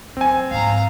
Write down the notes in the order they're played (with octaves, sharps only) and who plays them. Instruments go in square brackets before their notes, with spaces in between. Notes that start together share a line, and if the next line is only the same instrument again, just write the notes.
[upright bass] F#3 [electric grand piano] C4 G#5
[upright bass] G#2 F3 [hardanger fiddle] F5 A#5